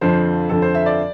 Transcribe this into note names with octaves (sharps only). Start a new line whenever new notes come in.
F2 D3 F3 C5
F2 D3 F3 A4
C5
E5
D5